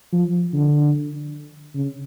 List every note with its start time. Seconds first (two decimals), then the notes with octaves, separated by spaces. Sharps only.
0.13 F3
0.53 D3
1.75 C#3